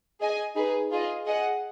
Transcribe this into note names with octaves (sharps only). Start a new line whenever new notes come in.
G#4 D#5 G#5
D#4 G#4 B4
F4 G#4 D#5
G#4 D#5 F#5